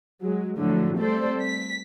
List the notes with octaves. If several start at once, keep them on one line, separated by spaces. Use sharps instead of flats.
F#3 G#3
A2 D3 F3 F#3 A3
G3 A3 C4 A4 C5 D5
B6